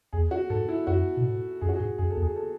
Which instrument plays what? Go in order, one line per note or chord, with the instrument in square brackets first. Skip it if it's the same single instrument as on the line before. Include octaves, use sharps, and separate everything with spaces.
[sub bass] E2 [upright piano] G#4
[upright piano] F#4
[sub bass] G#2 [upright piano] A4
[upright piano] E4
[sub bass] F#2 [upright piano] F#4
[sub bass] B2
A2
[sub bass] F#2 [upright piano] G#4
[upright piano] F#4
G#4
[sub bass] G#2
[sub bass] F#2 [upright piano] G#4
[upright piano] A4
[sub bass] E2
[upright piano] G#4
A4